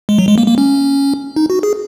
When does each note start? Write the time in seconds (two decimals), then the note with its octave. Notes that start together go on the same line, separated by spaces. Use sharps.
0.09 G#3
0.19 F#3
0.28 G#3
0.38 A#3
0.48 A#3
0.58 C#4
1.36 D#4
1.50 F#4
1.63 G#4